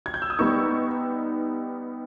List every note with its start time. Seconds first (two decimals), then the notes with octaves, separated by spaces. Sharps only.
0.06 G#6
0.14 G6
0.22 E6
0.30 D#6
0.39 G3 B3 D#4 C#6